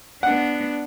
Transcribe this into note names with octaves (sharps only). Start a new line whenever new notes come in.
B3 D4 F#5